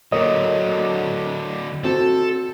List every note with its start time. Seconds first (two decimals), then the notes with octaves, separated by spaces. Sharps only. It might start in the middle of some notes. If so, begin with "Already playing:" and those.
0.12 D3 F#3 A#3 C#5 D#5
1.84 C4 F#4 A4